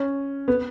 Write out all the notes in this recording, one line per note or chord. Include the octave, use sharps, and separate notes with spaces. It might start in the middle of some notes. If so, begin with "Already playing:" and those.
Already playing: C#4
B3